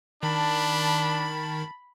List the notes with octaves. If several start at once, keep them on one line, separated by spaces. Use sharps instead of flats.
D#3 D4 A5 B5